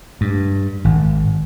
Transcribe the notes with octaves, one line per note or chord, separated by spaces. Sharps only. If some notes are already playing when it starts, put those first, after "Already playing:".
G2
G#1